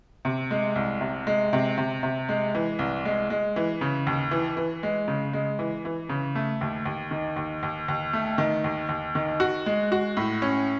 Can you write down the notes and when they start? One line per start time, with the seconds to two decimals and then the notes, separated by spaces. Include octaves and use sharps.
0.25 C3
0.51 G#3
0.76 C2
1.01 C3
1.27 G#3
1.53 C3
1.78 C3
2.03 C3
2.29 G#3
2.55 E3
2.79 C2
3.05 G#3
3.30 G#3
3.56 E3
3.81 C#3
4.07 D#2
4.31 E3
4.57 E3
4.83 G#3
5.08 C#3
5.33 G#3
5.59 E3
5.85 E3
6.09 C#3
6.35 A3
6.61 D#2
6.86 D#2
7.11 D#3
7.36 D#2
7.63 D#2
7.88 D#2
8.13 A3
8.38 D#3
8.64 D#2
8.89 D#2
9.15 D#3
9.40 F#4
9.66 G#3
9.92 F#4
10.17 A2
10.42 C#4